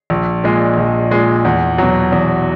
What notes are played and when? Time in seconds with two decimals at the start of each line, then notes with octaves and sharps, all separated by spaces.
0.10 A#1
0.44 A#2 G#3
0.77 A#1
1.11 A#2 G#3
1.45 E2
1.78 B2 F#3
2.12 E2